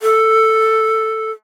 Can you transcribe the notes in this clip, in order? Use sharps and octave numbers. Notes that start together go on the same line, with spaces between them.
A4